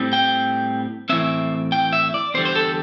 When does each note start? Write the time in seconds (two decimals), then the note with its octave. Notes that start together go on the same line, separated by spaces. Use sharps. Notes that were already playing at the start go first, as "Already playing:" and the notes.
Already playing: A2 G3 C4
0.13 G5
1.09 A2 E3 C4 E5
1.72 G5
1.93 E5
2.14 D5
2.34 E2 D3 G3 C5
2.45 C5
2.55 A4